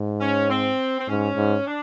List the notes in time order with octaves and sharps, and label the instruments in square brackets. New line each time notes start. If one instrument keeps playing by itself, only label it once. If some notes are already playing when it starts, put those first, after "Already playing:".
Already playing: [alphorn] G#2
[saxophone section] C#4
C4
C4
[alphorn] G#2 [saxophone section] C#4
[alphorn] G#2
[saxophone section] D4